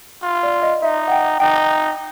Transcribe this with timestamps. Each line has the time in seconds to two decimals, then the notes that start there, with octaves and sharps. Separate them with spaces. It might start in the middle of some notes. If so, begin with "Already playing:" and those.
0.23 F4
0.43 D5
0.62 D#5
0.82 D#4 E5
1.08 F#5
1.12 G5
1.40 D#4 G5